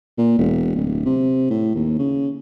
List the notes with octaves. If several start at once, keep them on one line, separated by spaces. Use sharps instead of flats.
A#2
E1
D1
C3
A2
D#2
C#3